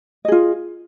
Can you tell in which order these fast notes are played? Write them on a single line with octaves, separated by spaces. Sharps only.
D#5 G#4 F4